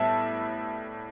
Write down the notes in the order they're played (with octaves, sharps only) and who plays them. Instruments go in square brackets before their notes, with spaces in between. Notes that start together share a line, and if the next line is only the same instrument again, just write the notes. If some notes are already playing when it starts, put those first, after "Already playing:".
Already playing: [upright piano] A2 G3 B3 E5 A5